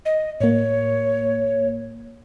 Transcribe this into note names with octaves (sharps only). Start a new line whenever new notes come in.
D#5
A2 A#3 C#5